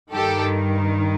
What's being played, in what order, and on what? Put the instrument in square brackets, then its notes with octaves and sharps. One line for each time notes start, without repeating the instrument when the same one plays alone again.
[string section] G2 D#3 G4 A4